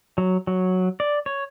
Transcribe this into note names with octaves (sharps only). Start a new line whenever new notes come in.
F#3
F#3
D5
C#5